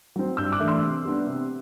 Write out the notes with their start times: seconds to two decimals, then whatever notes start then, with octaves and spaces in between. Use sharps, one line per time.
0.16 F#3 C4
0.37 G2 E6 G6
0.52 D6 F#6
0.60 E3 A3 D4
0.68 C6 E6
0.82 C3
1.05 G3 B3 D4
1.27 C3